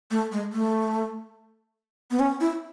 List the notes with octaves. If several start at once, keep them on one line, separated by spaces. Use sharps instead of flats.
A3
G#3
A3
B3
C#4
E4